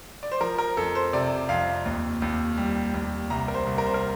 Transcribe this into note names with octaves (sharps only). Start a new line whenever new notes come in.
D5
C5
F3 A#4
A#4
F2 A4
C5
C3 D5
F2 F5
D#2
D#2
G3
D#2
C2 A#5
A#4
C5
C2
A#4
C5
A#4